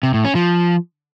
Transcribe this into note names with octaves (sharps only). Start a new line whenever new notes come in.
C3
A2
C#4
F3